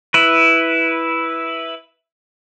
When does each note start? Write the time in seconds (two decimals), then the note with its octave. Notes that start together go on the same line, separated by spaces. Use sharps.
0.14 E4 B4